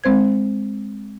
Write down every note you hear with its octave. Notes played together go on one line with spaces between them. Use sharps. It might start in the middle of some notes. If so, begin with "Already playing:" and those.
G#3 C4 C5 G#6